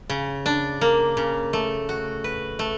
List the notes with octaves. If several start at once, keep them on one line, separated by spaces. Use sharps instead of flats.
C#3
D4
A#3
C#3
A3
F#4
B4
A3